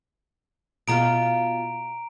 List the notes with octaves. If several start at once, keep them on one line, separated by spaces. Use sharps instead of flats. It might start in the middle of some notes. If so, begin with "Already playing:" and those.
B2 F4 F5 A#5 D7